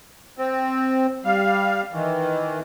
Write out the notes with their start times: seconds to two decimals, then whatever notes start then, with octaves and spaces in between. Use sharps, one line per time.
0.38 C4
1.25 G3 F5
1.93 D#3 E3